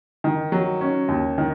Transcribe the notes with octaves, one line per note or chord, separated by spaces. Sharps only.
D#3
F#3
C#4
D#2
D#3